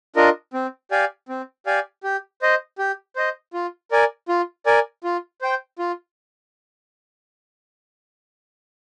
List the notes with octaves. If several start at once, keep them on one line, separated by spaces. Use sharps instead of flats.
D4 F4 A#4 D#5
C4
G4 D5 F5 G#5
C4
G4 D5 F5 G#5
G4
C5 D#5
G4
C5 D#5
F4
A#4 D5 G#5
F4
A#4 D5 G#5
F4
C5 G5
F4